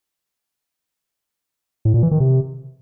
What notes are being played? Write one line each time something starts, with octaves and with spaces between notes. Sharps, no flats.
A2
A#2
E3
D#3
C3